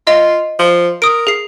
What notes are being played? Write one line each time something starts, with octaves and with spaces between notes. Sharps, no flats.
F4 D#5
F3
A#4 D#6 D7
G#4 C7